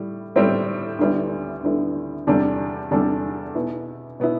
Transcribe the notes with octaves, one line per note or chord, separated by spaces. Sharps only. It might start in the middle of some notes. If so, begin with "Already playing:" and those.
Already playing: A2 G3 E4
A2 G3 C4 E4
D2 D3 G3 B3 E4
D2 D3 G3 B3 E4
E2 C3 G3 D4 A4
E2 C3 G3 D4 A4
B2 B3 E4
B2 B3 E4